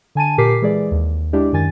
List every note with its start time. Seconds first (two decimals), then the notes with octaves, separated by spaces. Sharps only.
0.15 D3 G#5 A5 D#7
0.38 A#2 G4 A#4 D6 B6 C7
0.62 E3 G#3 G#4 D5
0.91 D#2
1.33 G#3 D4 E4 G4 D5
1.52 F#2 D#3 G#5 A6